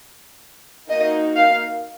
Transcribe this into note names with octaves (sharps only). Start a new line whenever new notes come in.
A#3 D#4 F#4 D#5
F5